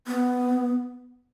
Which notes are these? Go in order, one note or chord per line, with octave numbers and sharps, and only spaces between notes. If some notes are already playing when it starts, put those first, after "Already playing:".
B3